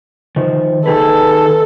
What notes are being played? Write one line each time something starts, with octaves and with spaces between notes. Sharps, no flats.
D#3 F3
D#3 G#4 A4 B4